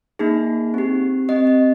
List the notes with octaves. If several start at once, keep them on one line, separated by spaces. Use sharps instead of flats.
A#3 D#4 G#4
C4 G4
C4 G4 D#5
D#5